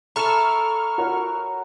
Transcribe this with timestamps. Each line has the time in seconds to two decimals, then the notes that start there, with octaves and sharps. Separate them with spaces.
0.16 E4 A4 A#5 C#6 F6 E7
0.98 F#4 A#4 C#5